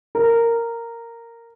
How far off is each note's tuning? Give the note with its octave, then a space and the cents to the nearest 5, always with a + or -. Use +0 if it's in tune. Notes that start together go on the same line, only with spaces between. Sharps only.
A#4 -10